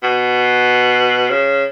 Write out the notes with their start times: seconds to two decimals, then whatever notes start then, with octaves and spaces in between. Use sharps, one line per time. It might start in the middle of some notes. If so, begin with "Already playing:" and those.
0.03 B2
1.30 C#3